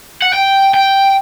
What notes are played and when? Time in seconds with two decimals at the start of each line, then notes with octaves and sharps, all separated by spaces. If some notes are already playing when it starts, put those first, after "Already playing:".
0.23 F#5
0.34 G5
0.74 G5